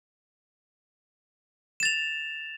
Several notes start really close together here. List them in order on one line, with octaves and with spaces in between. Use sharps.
E7 A6 F7